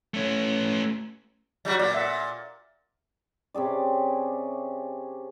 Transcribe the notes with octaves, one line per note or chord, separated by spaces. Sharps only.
A3 C#4
F#3 G3 F#4
A#2 D5
E5 F#5
C3 C#4 G#4 D5